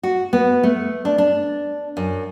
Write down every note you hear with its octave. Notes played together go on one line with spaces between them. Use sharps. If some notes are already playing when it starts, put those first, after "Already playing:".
F#4
B3
A3
D4
D4
F#2